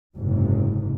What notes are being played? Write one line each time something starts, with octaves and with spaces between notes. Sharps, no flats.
F#1 G#2 C3